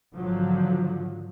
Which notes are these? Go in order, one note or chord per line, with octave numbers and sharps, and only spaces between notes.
G#1 D3 F3 F#3